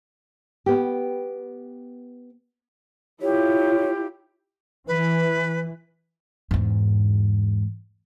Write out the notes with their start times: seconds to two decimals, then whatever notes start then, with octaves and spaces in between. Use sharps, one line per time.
0.66 B3 G4
3.22 E4 F4 G4 C#5
4.88 E3 B4
6.51 E2 G#2